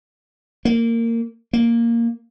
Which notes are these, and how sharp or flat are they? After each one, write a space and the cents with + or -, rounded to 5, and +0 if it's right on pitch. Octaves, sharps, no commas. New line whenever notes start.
A#3 -20
A#3 -5